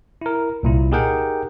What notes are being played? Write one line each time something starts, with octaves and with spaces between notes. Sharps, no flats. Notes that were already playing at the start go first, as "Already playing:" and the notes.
E4 A#4
C2 A#2 E4
D#4 G4 G#4 A#4 F#5 G5